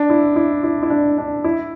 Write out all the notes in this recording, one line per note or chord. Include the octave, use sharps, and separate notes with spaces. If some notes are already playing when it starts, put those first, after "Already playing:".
Already playing: D4
E4
E4
E4
E4
D4
D4
E4